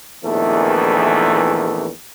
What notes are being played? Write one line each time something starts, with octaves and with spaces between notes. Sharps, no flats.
A#1 E2 D#3 E3 A3